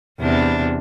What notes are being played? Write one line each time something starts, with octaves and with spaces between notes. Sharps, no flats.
E2 C3 D4